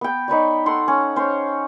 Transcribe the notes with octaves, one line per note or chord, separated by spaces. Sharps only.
B3 G5
D#4 B4 C#5 D5
A4 F#5 C6
C#4
C#4 C5 C#5